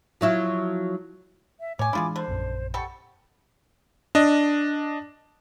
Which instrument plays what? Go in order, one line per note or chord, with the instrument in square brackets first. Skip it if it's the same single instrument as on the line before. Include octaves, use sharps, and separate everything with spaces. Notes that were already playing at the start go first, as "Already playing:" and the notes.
[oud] F3 F#3 E4
[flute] E5
[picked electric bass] A2 [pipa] C#5 G#5 [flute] D6
[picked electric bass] E3 G#3 D4 [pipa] E4 F4 G#4
[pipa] D3 [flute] C5
[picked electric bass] A#1 F#2
[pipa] G3 A4 C#6 [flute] F#5
[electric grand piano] D4 D#5